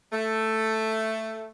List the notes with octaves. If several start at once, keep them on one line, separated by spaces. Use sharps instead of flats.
A3